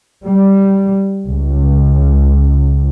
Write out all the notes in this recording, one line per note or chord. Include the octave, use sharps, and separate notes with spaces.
G3
C#2